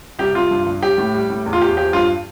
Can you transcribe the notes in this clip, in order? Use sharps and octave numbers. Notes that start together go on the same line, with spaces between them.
C2 G4
C2 F4
G2
G2
G3 G4
A2
G3
A2
E2
F4
E2 G4
F3 G4
G2 F4